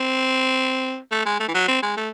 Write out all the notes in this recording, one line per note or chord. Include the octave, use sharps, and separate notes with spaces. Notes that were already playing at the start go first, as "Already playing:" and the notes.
Already playing: C4
A3
G#3
A3
E3
F#3
C4
G#3
A3